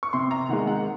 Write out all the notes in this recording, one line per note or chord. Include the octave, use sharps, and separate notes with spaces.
C#6
C3 C6
A#5
D#3 G#3 F#5
F#5